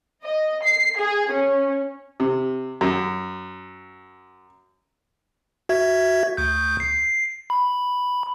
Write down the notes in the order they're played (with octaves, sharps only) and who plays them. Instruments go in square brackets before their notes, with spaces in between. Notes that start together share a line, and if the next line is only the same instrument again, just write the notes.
[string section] D#5
C7
G#4
C#4
[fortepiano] C3
F#2
[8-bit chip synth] F#4 E5 G#6
D2 G6
C7
B5